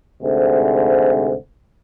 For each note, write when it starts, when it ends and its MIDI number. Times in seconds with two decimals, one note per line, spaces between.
0.22 1.33 38
0.22 1.33 44
0.22 1.33 48